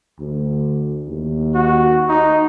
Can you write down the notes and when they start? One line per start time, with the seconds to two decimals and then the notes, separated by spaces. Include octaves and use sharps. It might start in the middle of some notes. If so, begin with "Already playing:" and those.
0.19 D2
1.08 D#2
1.55 F#4
2.09 D#4